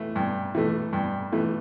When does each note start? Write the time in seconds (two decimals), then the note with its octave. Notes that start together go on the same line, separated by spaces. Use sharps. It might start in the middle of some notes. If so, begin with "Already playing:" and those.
Already playing: E3 A3
0.16 G2
0.55 E3 A3
0.93 G2
1.32 E3 A3